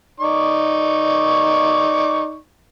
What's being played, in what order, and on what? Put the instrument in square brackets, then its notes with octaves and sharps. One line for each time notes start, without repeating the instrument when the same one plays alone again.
[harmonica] D#4 D5 C#6